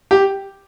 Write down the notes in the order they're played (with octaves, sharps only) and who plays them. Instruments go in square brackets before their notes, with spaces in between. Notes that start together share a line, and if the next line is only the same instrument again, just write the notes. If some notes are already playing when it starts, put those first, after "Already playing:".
[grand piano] G4